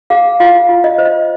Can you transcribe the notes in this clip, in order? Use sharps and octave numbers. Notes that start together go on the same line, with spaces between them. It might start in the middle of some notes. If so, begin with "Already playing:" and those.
G#4 F5
F4 F5
F4
D#5
C5
D#5